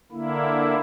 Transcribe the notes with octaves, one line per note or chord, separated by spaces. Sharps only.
D3 A#3 E4